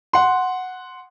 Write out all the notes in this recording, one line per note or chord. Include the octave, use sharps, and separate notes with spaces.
F#5 C6